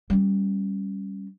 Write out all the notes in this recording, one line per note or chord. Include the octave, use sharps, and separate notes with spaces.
G3 C#4